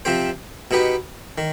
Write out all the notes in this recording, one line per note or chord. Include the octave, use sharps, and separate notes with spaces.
C3 F3 C4 G4 C5
B2 B3 D#4 G4 B4
D#3